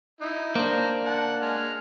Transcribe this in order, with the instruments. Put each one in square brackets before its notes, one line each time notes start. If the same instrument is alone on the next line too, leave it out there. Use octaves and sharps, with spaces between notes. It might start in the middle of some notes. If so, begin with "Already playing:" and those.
[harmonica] D#4 E4
[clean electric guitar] A#3 D4 [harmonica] C5 A#5
[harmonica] F#5 A5
G#3 F6